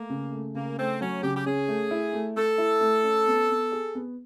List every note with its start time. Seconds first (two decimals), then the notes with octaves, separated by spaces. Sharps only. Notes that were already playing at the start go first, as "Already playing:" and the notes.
Already playing: A3 A#3
0.10 C#3
0.32 A3
0.54 C#3 A#3
0.77 A3 C4
1.00 F#3 C#4
1.23 C#3 G4
1.35 G4
1.45 C#4 G#4
1.68 A3
1.91 E4
2.13 A3
2.36 A3 A4
2.58 E4
2.81 A3
3.03 C#4
3.27 B3
3.49 B3
3.72 G#4
3.95 B3